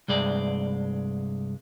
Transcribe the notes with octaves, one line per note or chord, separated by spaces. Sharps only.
C2 G2 G#3 D5